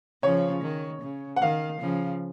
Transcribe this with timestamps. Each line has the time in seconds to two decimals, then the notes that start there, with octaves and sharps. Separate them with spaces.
0.23 C#3 F3 C#5
0.63 D#3
1.02 C#3
1.36 F#5
1.42 D#3 F5
1.81 C#3 F3